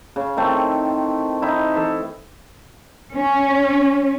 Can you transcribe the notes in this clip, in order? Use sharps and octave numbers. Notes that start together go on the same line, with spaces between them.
C#3
D#3 A3 C4 E4
D#4 E4
E3 A4
C#4